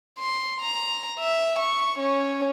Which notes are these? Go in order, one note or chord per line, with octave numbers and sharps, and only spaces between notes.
C6
A#5
E5
C#6
C#4